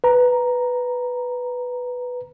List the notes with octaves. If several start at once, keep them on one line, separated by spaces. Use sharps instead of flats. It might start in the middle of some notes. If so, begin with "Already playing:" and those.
B4 A#5